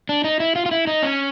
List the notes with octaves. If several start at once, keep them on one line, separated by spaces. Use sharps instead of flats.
D4
D#4
E4
F4
F4
E4
D#4
C#4